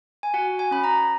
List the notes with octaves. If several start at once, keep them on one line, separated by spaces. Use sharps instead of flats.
G#5
F#4 F#5
G#5
C#4 B5
A#5